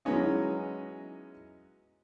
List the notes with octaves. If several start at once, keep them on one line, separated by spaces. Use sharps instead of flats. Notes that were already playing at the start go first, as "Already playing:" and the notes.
E3 F#3 G#3 B3 C#4 D#4